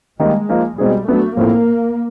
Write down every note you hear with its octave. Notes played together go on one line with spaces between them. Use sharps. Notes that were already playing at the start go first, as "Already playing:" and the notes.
D#3 G3 G#3 A#3 D#4
F3 A#3 D#4
B2 G3 G#3 C4 D#4 G#4
F#3 A3 B3 D4
A2 F3 A3 A#3 C4 E4